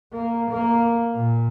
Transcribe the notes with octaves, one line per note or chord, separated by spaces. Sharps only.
A#3
A#3
A#2